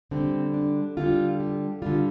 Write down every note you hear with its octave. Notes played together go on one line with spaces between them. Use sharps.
D3 G3 C4
D4
D3 G3 F4
G4
D3 G3 F4